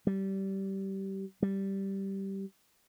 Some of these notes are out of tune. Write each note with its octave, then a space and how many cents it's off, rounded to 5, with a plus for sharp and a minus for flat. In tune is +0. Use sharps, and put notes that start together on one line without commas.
G3 -20
G3 -10